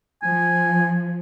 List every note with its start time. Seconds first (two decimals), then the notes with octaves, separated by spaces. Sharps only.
0.23 F3 G#5